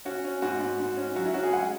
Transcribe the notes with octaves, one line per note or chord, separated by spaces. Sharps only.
C#4 F#4
C#4
G#2 F#4
G#2
G#2
C#4
F#3 F#4
E4
C#4 F#4
G#4
G#3 F#5